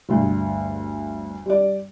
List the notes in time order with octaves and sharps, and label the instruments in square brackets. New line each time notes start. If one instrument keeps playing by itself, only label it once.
[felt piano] G1 D2
G3 D5